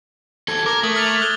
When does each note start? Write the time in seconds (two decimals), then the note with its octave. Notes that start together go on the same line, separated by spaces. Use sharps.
0.48 D#2 A4 G#6
0.66 A#4 D6
0.83 A3 D6 D#6 F#7
0.96 F6 A6 F7
1.21 F#6 G7